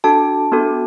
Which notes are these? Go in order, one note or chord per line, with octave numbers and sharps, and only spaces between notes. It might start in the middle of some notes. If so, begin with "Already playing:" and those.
D4 F#4 A4 A5
B3 D4 F#4 A4